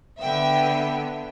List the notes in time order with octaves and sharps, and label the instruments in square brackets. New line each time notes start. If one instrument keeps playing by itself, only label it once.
[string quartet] D3 B3 [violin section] E5 G5